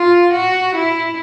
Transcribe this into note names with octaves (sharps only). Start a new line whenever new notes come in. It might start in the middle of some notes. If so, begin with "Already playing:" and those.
Already playing: F4
F#4
E4